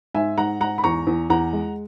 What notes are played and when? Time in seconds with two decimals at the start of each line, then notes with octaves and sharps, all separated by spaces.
0.14 G#2 E5 G#5
0.38 G#2 F#5 A#5
0.61 G#2 F#5 A#5
0.78 B5
0.84 E2 A#5 C#6
1.07 E2
1.30 E2 F#5 A#5
1.53 G#3